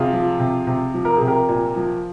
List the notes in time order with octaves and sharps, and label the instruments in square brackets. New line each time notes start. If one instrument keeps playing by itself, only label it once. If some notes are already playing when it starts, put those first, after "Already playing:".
Already playing: [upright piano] C3 F4 G#4
F3
C3
C3
F3
A#4
C3 G#4
G4 A#4
A#2
F3